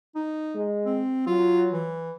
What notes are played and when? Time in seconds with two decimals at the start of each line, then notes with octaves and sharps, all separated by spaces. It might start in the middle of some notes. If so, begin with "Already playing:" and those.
0.15 D#4
0.54 G#3
0.85 C4
1.27 F#3 F4
1.71 E3